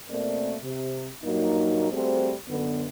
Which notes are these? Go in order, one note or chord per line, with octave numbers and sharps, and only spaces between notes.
B2 A3 A#3 C4 A#4 D5
C3
G2 A#2 F#3 A#3 D#4
G3 A3 C4 F#4 G#4 C5
F#2 D3 B3